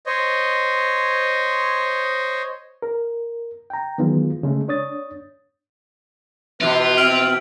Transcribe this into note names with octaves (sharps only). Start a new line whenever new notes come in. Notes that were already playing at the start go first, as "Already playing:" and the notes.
C5 C#5 D#5
A#4
G5 A#5
D#3 E3 F#3 G#3 B3 F4
C#3 G#3 A3
D4 C#5 D#6 A6
B2 E3 F3 F4 B4 E5
C4 E5 F6 D7 F#7